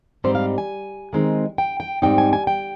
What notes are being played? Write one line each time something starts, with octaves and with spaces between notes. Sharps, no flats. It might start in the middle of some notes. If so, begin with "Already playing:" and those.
G#2 G3 C4 D#4 C5
F5
G#5
D#3 G#3 C4 D#4
G5
G5
G#2 G3 C4 D#4 G5
G#5
G#5
G5